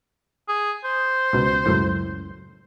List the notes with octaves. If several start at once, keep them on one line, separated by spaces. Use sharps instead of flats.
G#4
C5
C#2 B2
C#2 F#2 A2